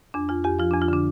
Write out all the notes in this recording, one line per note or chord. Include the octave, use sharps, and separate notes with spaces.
F2 D4
F2 F4
F2 G4
F3 F4
F2 D4
F4
D3 D4